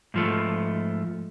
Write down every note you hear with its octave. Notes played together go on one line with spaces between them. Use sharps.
G#2 F3 A3